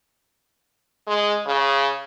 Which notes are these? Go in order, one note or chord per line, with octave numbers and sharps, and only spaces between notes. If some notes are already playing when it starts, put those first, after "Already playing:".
G#3
C#3